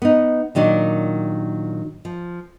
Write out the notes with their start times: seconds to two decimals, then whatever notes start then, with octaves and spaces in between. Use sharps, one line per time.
0.02 B3 D#4
0.55 A#2 D#3 F#3 D4
2.05 F3